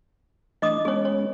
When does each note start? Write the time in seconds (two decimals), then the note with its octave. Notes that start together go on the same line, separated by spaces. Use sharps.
0.62 E3 A3 D4 D#5 D6 D#6
0.85 G#3 B3 C#4 G#4 C#5
1.05 C#5